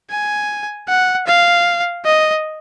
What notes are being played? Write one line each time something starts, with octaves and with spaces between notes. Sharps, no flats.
G#5
F#5
F5
D#5